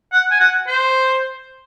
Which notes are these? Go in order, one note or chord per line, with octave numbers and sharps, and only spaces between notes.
F#5
G#5
F#5
C5